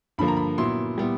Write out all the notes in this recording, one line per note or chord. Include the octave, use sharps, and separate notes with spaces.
G2 D3 F3 A#3 B5
A#5
B5
A#2 F#3 B3 E4 C6
A#2 G3 B3 E4